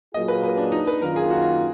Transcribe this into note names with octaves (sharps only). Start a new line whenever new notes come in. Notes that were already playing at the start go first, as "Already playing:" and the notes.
A#2 F#3 A#3 F4 G#4 D#5
B4
B4
D4
D#4
B4
F#2 D#3 A#3 F4 A#4
G#4
F#4